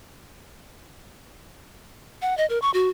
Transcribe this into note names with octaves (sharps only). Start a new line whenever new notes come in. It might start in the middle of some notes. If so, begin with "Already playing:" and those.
F#5
D#5
A#4
C#6
F#4